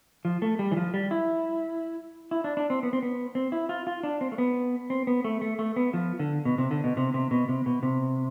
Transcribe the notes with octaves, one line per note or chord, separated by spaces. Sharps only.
F3
A3
G3
E3
F3
G3
E4
E4
D4
D4
C4
B3
C4
B3
C4
E4
F4
F4
D4
C4
A3
B3
C4
B3
A3
A3
A3
B3
F3
D3
B2
C3
D3
B2
C3
C3
B2
C3
B2
C3